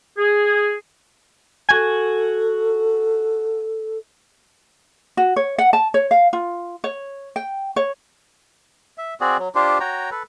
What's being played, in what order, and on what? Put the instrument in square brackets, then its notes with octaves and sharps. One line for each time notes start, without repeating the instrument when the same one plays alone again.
[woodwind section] G#4
[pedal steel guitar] F#4 G#5 [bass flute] A4
[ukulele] F#4
C#5
F#5
A5
C#5
F5
F4
C#5
G5
C#5
[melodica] E5
C4 F#4 G#4 D5
F#3
D4 F4 G4 C5
F#4 C#5 G5 A#5
A4 B4